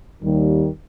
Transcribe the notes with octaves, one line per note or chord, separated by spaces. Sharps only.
D#2 D#3 G3